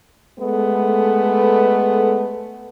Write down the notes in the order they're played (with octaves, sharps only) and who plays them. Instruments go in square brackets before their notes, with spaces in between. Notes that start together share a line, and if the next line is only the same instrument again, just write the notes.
[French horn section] G#3 A3 B3 A4 B4